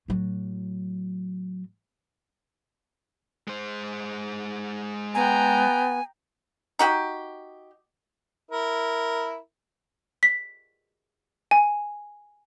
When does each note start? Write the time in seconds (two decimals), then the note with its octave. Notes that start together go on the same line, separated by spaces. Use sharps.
0.08 A2 F#3
3.48 G#3 C5
5.15 B3 G5 G#5 A#5
6.79 D#4 F#4 G4
8.51 E4 A#4
10.23 B6
11.51 G#5